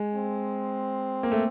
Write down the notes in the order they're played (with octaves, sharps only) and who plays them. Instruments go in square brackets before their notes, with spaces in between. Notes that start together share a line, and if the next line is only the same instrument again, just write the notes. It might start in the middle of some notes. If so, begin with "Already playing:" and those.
Already playing: [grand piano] G#3
[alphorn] C4
[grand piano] A#3
A3